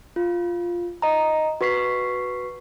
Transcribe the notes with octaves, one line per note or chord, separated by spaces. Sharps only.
F4
D#5 A#5
F#4 B4 C#6 B6 C7